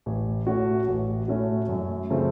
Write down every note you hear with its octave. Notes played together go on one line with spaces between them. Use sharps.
A1
A2 A3 C#4 F#4
A1
A2 A3 C#4 F#4
F#2
C#3 F3 A3 C4